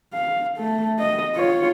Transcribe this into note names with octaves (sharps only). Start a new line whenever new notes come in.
F5
A3
D#5
F4 C#5